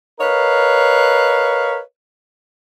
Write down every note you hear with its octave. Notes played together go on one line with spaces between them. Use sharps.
A#4 B4 C#5 D#5 F5